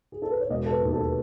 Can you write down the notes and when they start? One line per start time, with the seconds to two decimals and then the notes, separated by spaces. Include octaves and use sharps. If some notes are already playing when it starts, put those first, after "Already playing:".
0.12 G#4
0.22 A4
0.31 B4
0.40 C#5
0.50 E1 D#5
0.66 A4
0.71 B4
0.82 D#2
0.93 A4